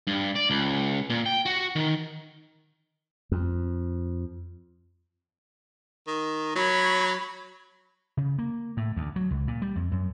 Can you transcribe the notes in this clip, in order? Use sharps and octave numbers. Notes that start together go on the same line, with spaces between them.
G2
D5
C#2
A#2
G5
F#4
D#3
F2
D#3
F#3 C#5 B5
C#3
A#3
A2
D2
F#3
C#2
A#2
G3
F2
F#2